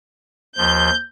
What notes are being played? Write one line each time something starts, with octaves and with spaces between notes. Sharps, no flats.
D#2 F3 G6